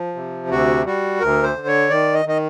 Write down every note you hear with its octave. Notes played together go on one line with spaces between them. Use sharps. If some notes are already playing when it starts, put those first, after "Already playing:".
Already playing: F3
C3
D2 F#4
G3 F#4
D2 A#4
C5
D3
C#5
D#3 D5
D#5
D#3 D#5